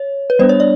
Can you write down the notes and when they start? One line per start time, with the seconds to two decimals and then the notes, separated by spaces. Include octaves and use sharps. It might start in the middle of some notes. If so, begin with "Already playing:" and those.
Already playing: C#5
0.30 B4
0.39 G3 B3 D4 C5
0.49 C#5
0.60 D5